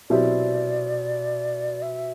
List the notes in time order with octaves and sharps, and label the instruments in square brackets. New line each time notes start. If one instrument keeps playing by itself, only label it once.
[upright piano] B2 F#3 C4 E4 G4 [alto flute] D5
[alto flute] E5